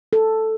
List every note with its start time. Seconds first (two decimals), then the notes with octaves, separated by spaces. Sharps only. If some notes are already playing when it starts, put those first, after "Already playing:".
0.13 A4